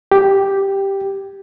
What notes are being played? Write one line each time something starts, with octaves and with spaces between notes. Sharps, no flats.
G4